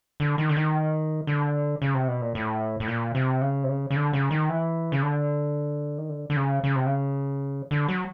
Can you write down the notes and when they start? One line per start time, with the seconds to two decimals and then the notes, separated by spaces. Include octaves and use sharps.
0.20 D3
0.38 D#3
0.49 D3
0.57 D#3
1.27 D3
1.82 C#3
1.94 C3
2.08 B2
2.21 A#2
2.35 A2
2.80 A2
2.88 A#2
3.15 C3
3.41 C#3
3.64 C3
3.69 C#3
3.91 C#3
3.96 D3
4.13 C#3
4.31 D#3
4.49 E3
4.92 C#3
5.03 D3
5.98 D#3
6.09 D3
6.30 D3
6.36 C#3
6.64 C#3
6.75 C3
6.86 C#3
7.71 D3
7.88 F#3